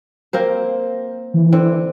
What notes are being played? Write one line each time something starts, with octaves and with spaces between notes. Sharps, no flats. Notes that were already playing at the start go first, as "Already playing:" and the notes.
A#3 C4 C5
E3
D3 C4